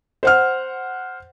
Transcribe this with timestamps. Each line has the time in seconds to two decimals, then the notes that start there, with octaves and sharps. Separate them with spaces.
0.23 C5 F#5 F6